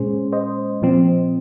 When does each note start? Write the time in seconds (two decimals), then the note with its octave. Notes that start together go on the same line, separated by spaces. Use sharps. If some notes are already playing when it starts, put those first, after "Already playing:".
Already playing: A#2 G#3 C#4 G#4 C5
0.33 C5 D#5
0.82 A#2 F3 C4